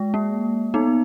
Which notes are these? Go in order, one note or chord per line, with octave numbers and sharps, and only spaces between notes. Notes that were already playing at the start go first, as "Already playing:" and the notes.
Already playing: G#3
A#3
B3 D#4